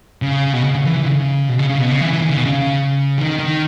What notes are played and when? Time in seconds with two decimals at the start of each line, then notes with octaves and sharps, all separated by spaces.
0.22 C#3
0.53 B2
0.64 C#3
0.75 C#3
0.85 E3
0.96 E3
1.02 D#3
1.06 C#3
1.49 B2
1.59 C#3
1.69 C#3
1.80 B2
1.91 C#3
2.01 E3
2.12 E3
2.22 D#3
2.30 C#3
2.37 B2
2.45 C#3
3.18 D#3
3.39 D#3